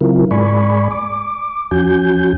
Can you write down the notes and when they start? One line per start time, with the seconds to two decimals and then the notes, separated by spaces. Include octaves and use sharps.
0.01 C#3 F#3 C4 E4 F4 A#4
0.31 G#2 G#3 D5 G#5 B5 C#6
0.91 D6
1.71 E2 F3 C#4 F#4 G#5 G6